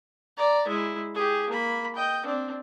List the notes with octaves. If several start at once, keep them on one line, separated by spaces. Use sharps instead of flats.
D5 A#5
G#3 E4
G4 G#4
A#3 B5
D#5 G5
C4 D4